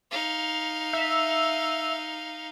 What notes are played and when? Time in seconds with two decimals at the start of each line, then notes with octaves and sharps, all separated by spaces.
0.11 D#4 F5
0.93 E5